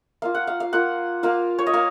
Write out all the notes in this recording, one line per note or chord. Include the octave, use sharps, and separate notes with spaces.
A#3 F4 F5
F#5
F5
F5
A#3 F4 F#5
A#3 F4 F5
C#5
D#5
A#3 F5